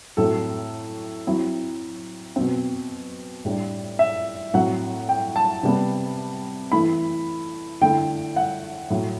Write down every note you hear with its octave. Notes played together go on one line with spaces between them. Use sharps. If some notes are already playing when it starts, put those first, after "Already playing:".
A2 F#3 A3 C4 A4
F#3 C4 E4
B2 F#3 C4
A2 G3 D4
E5
A2 F#3 C4 F#5
G5
A5
C3 G3 B3
E3 A3 E4 B5
D3 A3 E4 G5
F#5
A2 F#3 A3